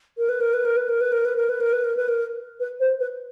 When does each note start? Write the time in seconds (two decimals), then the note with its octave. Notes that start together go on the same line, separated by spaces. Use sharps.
0.17 A#4
0.28 B4
0.40 A#4
0.53 B4
0.65 A#4
0.76 B4
0.88 A#4
1.00 B4
1.12 A#4
1.25 B4
1.36 A#4
1.49 B4
1.60 A#4
1.72 B4
1.84 A#4
1.96 B4
2.08 A#4
2.59 B4
2.79 C5
3.00 B4